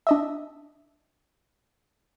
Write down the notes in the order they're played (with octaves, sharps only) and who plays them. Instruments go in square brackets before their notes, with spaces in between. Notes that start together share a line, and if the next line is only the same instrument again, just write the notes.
[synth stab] D4 D#5 E5